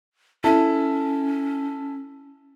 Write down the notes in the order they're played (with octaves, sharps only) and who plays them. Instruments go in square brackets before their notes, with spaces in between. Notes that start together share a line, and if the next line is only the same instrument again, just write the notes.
[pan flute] C#4 [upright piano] E4 A4 A5